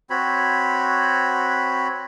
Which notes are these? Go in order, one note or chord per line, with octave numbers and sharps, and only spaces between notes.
C4 F#4 C#5 B5